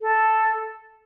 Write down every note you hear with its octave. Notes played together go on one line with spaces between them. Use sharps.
A4